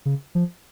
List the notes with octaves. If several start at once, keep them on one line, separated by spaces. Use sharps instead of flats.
C#3
F3